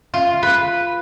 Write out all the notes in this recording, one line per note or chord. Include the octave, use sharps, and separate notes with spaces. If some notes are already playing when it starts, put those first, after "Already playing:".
F4
B4